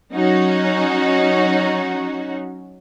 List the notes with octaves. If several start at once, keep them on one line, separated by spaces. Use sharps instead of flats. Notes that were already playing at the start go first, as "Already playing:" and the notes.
F#3 C#4 D#4 F#4